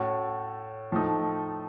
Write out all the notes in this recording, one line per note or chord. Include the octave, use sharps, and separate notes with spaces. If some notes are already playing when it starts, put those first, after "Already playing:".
Already playing: A2 A3 C#4 F#4
A2 F3 A3 D#4